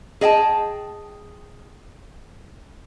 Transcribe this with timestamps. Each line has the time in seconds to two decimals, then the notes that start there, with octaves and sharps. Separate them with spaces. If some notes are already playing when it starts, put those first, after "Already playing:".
0.21 G#4 D#5 G5 A5